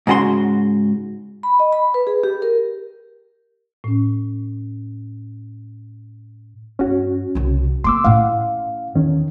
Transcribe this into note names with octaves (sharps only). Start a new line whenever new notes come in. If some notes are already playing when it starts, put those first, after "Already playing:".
G#2 C#3 F#4 G#4 C6
B5
D#5
B5
B4
G#4
G4
A#4
A2 C#4
G2 C#4 F#4
C2 C#3
A#3 C4 C6 D6 E6
A2 C#4 F5 F#5
E2 D#3 C#4